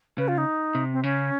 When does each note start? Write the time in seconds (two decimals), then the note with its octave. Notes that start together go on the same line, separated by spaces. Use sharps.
0.18 C#3 B4
0.28 F4
0.38 D#4
0.75 C3
0.93 C4
1.03 C#3 C#4